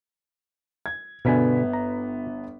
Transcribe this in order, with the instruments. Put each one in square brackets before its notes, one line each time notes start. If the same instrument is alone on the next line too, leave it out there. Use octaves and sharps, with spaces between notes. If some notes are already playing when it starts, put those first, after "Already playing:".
[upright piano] G#6
[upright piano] G1 B3 B6 [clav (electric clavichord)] B2 D3 G#5
[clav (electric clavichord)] A#5